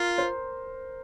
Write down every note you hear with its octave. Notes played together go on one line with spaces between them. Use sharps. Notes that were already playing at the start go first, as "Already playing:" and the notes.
Already playing: F4 A#4
C5